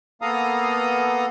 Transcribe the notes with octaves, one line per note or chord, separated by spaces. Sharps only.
A#3 B3 A4 F5 A#5 D#6